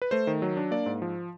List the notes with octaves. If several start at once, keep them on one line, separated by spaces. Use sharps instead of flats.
B4
A3 C5
D#3
F#3
D4
A#3 D5
G#2
F3